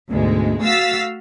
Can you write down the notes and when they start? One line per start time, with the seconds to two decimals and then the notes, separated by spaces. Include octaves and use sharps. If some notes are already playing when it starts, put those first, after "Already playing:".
0.11 D2 G#2 B2 G#3
0.62 A3 F#4 F5 E6 A6 B6